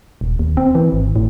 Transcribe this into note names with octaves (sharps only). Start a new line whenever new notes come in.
D#1
D#2
C4
E3
G#1
A2